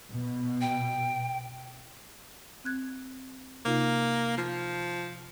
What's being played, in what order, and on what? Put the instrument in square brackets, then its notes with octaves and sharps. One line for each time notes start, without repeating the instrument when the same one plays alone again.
[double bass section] B2
[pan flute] G5
[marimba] C4 F#6 G#6
[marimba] C3 D#4 F4 [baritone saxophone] A#3
[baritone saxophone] F3